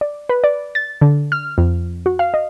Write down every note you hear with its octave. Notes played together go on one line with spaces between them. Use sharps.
D5
B4
D5
A6
D3
F6
F2
F#4
F5
D#5